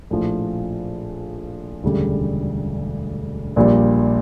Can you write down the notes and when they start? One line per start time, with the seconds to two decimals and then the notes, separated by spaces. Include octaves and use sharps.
0.11 A#1 A2 F3
1.83 E1 D2 C#3 G3
3.56 A#1 A#2 G3